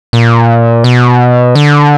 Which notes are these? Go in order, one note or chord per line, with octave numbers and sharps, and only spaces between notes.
A#2
B2
D3